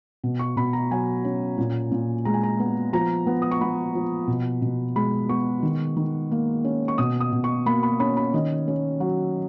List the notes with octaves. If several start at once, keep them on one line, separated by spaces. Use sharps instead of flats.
B2
C#6
B2 B5
A#5
F#3 G#5
C#4
A#2
A#2
G#3 A#5
G#5
A#5
B3
F3 A#5
B3
D#6
C#6
B3 B5
F3
B2
B2
G#3 B5
B3 C#6
D#3
D#3
A#3
C#4
C#6
B2 D#6
D#6
B2
C#6
A#3 B5
B5
C#4 B5
B5
D#3 D#5
C#4
F#3